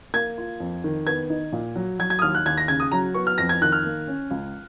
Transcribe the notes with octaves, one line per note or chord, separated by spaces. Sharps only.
A#3 G#6
F4
F2
D#3
B3 G#6
D#4
A#2
F#3
F#3 G#6
G#6
D#6
D#2 F6
F#6
D#2 G#6
A#6
C#3 G#6
D#6
F#3 A#5
B3 C#6
F6
F2 A#6
G#6
D#3 F#6
F6
A#3
C#4
C#2